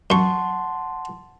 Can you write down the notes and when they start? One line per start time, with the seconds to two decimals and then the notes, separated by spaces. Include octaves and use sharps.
0.10 F#2 F#5 A5 C6 C#6